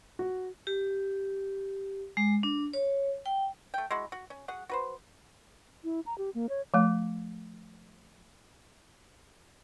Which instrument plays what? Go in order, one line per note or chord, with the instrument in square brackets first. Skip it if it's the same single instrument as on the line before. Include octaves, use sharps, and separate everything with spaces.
[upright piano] F#4
[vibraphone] G4
G#3
D4
C#5
G5
[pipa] A3 G5
G#3 E4 F#4
F#4
C#4
F#4 G#4 F#5
F#4 B4 C5
[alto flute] E4
A#5
G4
A#3
C#5
[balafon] F3 A3